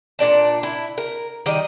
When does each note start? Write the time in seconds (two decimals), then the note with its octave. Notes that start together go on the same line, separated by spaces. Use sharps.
0.19 A#2 D4 D5 A5
0.63 E4
0.98 A#4
1.46 D#3 G3 D#5